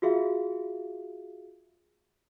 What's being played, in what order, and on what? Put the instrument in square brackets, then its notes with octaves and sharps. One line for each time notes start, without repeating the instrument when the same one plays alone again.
[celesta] F4 F#4 G#4 E5 F5